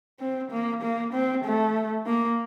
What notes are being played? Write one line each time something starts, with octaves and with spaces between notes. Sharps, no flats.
C4
A#3
A#3
C4
A3
A#3